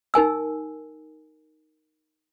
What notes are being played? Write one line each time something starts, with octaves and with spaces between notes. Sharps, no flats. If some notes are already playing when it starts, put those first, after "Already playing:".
D#4 A#4 G#5 E6